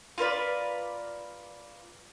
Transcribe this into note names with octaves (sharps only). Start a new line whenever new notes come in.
F4 A#4 B4 D5